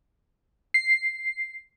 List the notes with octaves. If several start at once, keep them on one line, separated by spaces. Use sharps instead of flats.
C7